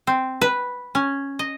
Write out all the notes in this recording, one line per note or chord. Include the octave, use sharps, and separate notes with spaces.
C4
B4
C#4
D#5